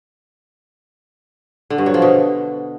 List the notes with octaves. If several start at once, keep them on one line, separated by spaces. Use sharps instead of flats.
D3
G2
F#3
F3
B2